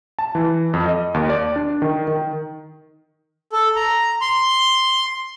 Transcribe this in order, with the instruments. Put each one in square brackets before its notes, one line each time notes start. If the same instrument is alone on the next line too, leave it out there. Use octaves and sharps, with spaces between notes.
[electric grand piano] A5
E3
F2
D#5
D#2
D5
D4
D#3
D#3
[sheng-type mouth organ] A4
A#5
C6